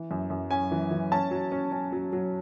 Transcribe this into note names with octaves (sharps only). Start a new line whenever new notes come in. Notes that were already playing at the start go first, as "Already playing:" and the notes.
Already playing: E3
F#2
F#2
C#4 G#5
E3
E3
C#4 A5
F#3
C#4
C#4
F#3
F#3